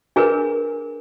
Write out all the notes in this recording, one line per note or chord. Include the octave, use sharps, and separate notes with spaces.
D4 G#4 A#4 B4